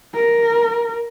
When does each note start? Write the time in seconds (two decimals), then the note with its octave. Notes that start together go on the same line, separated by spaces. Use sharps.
0.14 A#4